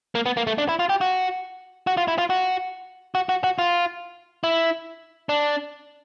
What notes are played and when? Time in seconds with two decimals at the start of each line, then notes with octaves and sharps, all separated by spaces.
0.15 A#3
0.26 B3
0.37 A#3
0.47 A3
0.58 D4
0.69 E4
0.79 F4
0.89 G4
1.01 F#4
1.87 F#4
1.97 F4
2.08 E4
2.18 F4
2.30 F#4
3.15 F#4
3.29 F#4
3.44 F#4
3.59 F4
4.44 E4
5.29 D4